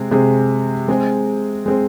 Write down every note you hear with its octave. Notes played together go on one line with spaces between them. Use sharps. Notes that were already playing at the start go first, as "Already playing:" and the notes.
Already playing: C3 G#3 C4 G#4
C3 G#3 C4 G#4
G#3 C4 G#4
G#3 C4 G#4